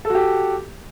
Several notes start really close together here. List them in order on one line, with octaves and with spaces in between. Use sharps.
A4 F#4 G4